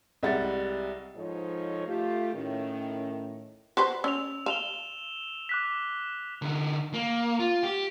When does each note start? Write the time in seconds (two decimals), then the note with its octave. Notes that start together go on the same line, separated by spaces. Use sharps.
0.23 C2 G3 G#3 F#5 A6
1.16 G#2 F3 D#4 G#4 A4 C#5
1.87 A3 F4 G4
2.33 A2 D#3 C#4
3.77 F#4 B4 C5
4.04 C#4 E6 F7
4.46 F5 E7 F7 G7
5.49 D6 F#6 B6
6.42 D3 D#4
6.93 A#3
7.39 F4
7.63 G4